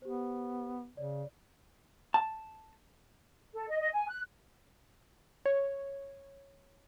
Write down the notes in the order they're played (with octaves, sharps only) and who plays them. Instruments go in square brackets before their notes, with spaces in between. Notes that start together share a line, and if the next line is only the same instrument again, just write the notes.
[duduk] B3 [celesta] G4 C5
[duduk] C#3 [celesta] C#5 D5
[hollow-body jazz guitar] A5
[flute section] A4
D#5
D#5
G#5
F#6
[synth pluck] C#5